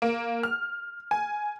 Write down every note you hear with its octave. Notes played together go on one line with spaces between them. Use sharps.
A#3
F6
G#5